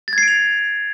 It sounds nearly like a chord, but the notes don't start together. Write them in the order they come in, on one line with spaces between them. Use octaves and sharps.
A6 G#6 C7 D7 F7